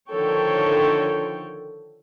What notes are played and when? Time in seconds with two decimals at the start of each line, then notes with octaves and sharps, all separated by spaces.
0.11 D3 D#3 F3 A4 C#5 G5